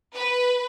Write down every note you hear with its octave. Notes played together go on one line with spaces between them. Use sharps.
B4